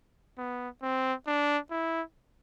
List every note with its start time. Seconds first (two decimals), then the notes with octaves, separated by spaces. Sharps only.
0.38 B3
0.83 C4
1.27 D4
1.71 E4